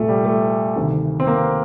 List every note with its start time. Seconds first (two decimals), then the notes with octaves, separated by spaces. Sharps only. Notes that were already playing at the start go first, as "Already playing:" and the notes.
Already playing: C2 A#2 A3
0.08 G3
0.25 A3
0.76 D2 C3 D#3
1.20 C4
1.27 A#3